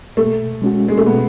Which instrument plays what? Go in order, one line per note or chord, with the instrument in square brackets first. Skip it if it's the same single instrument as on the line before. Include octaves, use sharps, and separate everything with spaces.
[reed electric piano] B2 [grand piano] A3
[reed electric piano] G#3 C#4 F#4
[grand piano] G#3
A3
[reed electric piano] B2 [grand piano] B3